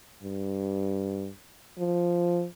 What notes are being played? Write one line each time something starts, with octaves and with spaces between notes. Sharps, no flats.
G2
F3